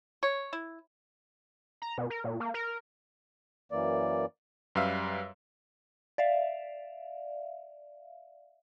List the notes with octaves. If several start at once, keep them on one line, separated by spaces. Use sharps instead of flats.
C#5
E4
A#5
B2
A#4
A#2
A#3
A#4
F#2 E3 A#3 D5
F#2 G3 B4 E5 F5 E6
D5 E5 F5